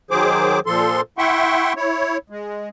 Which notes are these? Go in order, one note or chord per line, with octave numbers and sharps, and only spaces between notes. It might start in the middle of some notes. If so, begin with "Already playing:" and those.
D#3 F#3 G#4 C5 D6
A#2 F3 A4 C6
E4 E5 F#5 G5 C6 C#6
E4 C#5
G#3